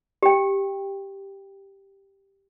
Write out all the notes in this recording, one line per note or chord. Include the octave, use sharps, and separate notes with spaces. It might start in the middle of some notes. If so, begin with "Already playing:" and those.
G4 G5